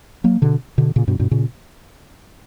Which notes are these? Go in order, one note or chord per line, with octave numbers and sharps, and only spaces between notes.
F#3 A#3
B2 D3
B2 D3
A#2 C#3
G2 B2
G2 B2
A#2 C#3